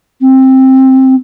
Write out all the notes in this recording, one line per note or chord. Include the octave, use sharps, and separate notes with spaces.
C4